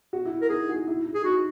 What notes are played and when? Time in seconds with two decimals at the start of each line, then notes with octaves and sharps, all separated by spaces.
0.13 F#4
0.25 E4
0.42 A#4
0.49 D#4 G#4
0.69 F#4
0.87 E4
1.06 E4
1.15 G#4
1.24 D#4 F#4